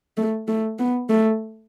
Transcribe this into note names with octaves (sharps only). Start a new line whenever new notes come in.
A3
A3
B3
A3